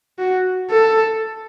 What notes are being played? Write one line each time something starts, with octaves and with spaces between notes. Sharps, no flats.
F#4
A4